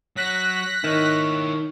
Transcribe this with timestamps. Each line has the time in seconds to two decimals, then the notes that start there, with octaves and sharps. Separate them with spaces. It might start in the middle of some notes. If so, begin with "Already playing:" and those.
0.16 F#3 F#6 A#6 B6
0.84 D#3 E4 C#5